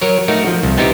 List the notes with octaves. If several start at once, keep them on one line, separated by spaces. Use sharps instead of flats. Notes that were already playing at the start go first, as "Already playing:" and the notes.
F#3 A#4 C#5
A3 D#4 F#4 A#4
F3
C2
B3 C4 D#4 E4 F#4 G4